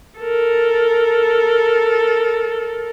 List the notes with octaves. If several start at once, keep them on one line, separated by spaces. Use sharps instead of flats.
A4 A#4